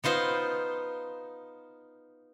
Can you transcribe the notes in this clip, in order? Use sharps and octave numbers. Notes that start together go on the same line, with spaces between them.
B3 D#4 F4 C5